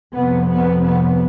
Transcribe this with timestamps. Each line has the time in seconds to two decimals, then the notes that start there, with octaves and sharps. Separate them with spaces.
0.15 F2 C3 B3
0.50 B3
0.84 B3